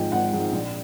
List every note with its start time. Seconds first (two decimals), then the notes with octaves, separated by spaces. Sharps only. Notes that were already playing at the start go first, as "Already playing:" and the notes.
Already playing: G#1 G#2 F3 G#3 G5
0.12 G#1 F#5
0.33 G#2 F3 G#3
0.52 A#1